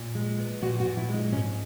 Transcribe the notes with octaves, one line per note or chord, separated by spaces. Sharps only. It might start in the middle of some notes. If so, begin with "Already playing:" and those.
Already playing: A#2
G#3
B3
A#2 F#4
F#4
A#2
E4
G#3
D#4
G#2 C#4